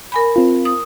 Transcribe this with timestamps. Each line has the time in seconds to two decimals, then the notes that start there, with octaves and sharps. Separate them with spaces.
0.12 A#4 G#5 B5
0.36 C4 F4
0.65 D#6